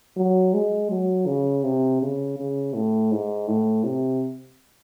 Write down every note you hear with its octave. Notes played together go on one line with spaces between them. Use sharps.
F#3
G#3
F#3
C#3
C3
C#3
C#3
A2
G#2
A2
C3